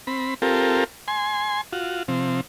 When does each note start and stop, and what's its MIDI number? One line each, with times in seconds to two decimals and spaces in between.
0.07 0.34 60
0.07 0.34 83
0.42 0.84 60
0.42 0.84 65
0.42 0.84 67
0.42 0.84 69
0.42 0.84 70
1.08 1.61 80
1.08 1.61 84
1.73 2.03 65
1.73 2.03 66
2.08 2.41 48
2.08 2.41 53
2.08 2.41 60